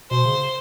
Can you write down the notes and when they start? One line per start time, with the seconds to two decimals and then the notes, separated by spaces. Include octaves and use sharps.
0.10 B2 C5
0.25 C#3